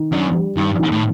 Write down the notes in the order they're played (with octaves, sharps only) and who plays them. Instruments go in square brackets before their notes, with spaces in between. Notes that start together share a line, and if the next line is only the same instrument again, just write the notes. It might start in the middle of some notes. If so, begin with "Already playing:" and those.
Already playing: [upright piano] D#3
[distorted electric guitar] F#2 [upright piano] D4
[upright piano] G3
[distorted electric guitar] G2 [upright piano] D#3
[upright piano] D#3
[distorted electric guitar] A2